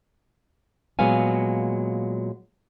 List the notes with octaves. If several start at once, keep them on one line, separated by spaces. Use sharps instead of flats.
A#2 F#3 G#3 B3 F5 G#5